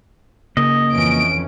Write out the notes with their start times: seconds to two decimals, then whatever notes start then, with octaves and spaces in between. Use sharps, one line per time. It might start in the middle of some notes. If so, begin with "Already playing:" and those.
0.57 C#3 A#3 D#5
0.93 F2 E3 C#4 D7